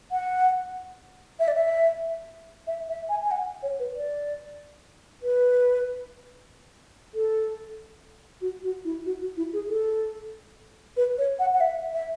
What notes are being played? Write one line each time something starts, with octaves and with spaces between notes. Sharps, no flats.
F#5
E5
D5
E5
E5
E5
G#5
G#5
F#5
C#5
B4
D5
B4
A4
F#4
F#4
E4
F#4
F#4
E4
G#4
A4
B4
C#5
F#5
F#5
E5
E5